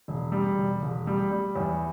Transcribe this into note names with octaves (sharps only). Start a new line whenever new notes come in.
E1
G3
E1
E1
G3
G3
E2